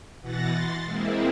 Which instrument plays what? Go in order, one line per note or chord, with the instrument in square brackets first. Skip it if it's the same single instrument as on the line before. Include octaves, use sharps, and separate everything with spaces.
[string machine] B2 E3 F#5 A6 A#6
C6 A6
G#3 A#3 C4 E4